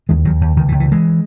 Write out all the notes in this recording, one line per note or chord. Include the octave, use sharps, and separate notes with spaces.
D#2 E3 G#3
D#2 D#3 F#3
D#2
C#2 D#3
E3
C#2
E3
C3
E3 G#3